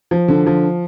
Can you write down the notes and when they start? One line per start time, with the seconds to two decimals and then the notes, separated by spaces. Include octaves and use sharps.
0.11 F3
0.28 D3
0.47 F3